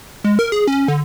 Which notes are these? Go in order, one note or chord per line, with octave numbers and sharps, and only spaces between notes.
G#3
A#4
G#4
C#4
D3